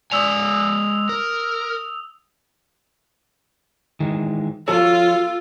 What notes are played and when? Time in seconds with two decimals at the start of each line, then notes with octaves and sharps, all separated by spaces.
0.12 G#3 D5 G#5 D#6 E6 F7
1.09 A#4
4.00 D#3 E3 G#3
4.68 F3 F4 F#4 A4 C#5